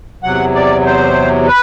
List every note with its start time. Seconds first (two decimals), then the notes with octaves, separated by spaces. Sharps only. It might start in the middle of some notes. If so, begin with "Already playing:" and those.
0.23 E2 C3 F#3 F#5
0.55 D5
0.86 C5
1.48 B4